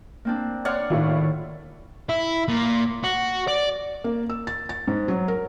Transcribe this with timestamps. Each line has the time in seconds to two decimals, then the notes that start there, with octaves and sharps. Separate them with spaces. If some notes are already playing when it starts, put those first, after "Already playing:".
0.25 A#3 C4 D4
0.65 C#5 D5 F5 F#5 C6
0.90 A2 D#3 E4 F4
2.09 E4
2.48 A#2
3.04 F#4
3.48 D5
4.04 A#3
4.30 E6
4.47 A6
4.69 A6
4.88 G#2
5.08 F#3
5.28 A#4